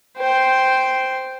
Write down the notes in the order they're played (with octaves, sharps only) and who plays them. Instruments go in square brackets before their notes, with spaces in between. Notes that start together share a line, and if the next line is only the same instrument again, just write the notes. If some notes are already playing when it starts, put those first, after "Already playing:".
[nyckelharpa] C5 G5